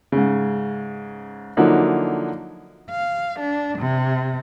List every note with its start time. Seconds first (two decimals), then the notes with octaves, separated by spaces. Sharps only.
0.12 G#2 C#3
1.57 D3 F3 F#3 A#3 D#4 E4
2.91 F5
3.39 D4
3.79 C3